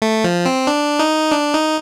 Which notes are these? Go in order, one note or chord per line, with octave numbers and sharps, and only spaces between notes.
A3
F3
C4
D4
D#4
D4
D#4